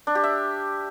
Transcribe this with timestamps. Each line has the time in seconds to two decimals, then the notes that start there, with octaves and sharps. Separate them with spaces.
0.07 D4
0.15 G4
0.24 E5